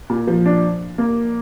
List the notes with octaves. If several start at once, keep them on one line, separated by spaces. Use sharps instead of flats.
A#2
F3
D4
A#3